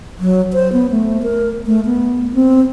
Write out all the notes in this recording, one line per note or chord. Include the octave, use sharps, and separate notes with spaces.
F#3
C5
B3
A3
A#4
A3
B3
C4